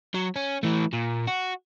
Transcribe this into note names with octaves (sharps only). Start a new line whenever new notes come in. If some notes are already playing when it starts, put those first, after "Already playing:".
F#3
C#4
E3 A3
A#2
F#4